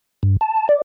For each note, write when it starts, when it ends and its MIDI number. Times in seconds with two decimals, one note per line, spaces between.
0.23 0.37 43
0.41 0.68 81
0.69 0.82 74